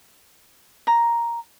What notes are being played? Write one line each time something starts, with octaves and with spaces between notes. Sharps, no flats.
A#5